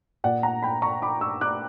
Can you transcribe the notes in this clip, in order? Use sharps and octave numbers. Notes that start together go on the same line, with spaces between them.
A#2 D5 F#5
F#5 A#5
G5 B5
A#5 C#6
B5 D6
C#6 E6
D6 F#6